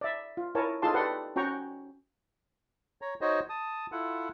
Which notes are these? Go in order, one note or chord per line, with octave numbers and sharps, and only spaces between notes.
D5 E5
F4
E4 A#4 C#5 G#5 A5
D#4 F4 G#4 A4 A5 C6
G4 A4 B4 D5 F#5 C6
C#4 F#4 G5 A#5 C#6
C#5 A#5
D#4 F#4 C5 C#5 D#5
A5 D#6
E4 F4 A4 F#5